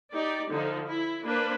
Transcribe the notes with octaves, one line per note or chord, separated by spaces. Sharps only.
D#4 G4 D5
D3 F3 D#4
E4
A#3 D4 B4 C5